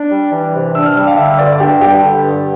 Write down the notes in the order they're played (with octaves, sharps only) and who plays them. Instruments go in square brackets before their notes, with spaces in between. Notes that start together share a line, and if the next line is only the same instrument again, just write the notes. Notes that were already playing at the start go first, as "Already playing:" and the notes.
Already playing: [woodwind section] D4
G3
E3
C3
[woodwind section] D4 [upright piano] E6
[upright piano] F6
[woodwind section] G3 [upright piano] E6
[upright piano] F5
[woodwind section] D3 [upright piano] E5
[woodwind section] G2 [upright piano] D5
[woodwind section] D4 [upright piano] G4
[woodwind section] G3 [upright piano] G4
[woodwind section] D3
G2